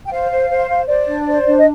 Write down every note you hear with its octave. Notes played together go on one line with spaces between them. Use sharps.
G5
C5 F5
C5
C5
C5
C5 D5
D4
C5
D4
D#5